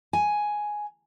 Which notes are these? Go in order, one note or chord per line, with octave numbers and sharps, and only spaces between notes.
G#5